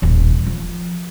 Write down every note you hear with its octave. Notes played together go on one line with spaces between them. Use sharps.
D#1 A1
F3